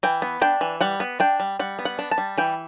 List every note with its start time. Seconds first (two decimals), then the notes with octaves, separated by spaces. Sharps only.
0.03 E3 G5
0.22 B3
0.42 D4 G5
0.61 E3
0.81 G3 F#5
1.00 B3
1.20 D4 G5
1.40 G3
1.59 G3 F#5
1.79 B3
1.85 F#5
1.99 D4
2.11 A5
2.18 G3
2.38 E3 G5